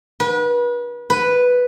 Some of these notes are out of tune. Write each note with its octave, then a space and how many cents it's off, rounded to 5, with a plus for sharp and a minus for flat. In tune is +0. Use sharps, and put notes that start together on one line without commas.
B4 -35
B4 +0